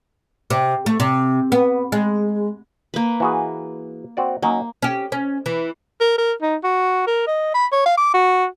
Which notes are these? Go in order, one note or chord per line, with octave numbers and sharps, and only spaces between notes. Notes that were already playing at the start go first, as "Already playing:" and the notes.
C3
A3
C3
B3
G#3
A#3 B4
E3 F#4 G#4
C4 F#4 D5
F#3 A#3 C#4 D#4
C#4 G4
C#4
E3
A#4
A#4
D#4
F#4
A#4
D#5
B5
C#5
F5
D6
F#4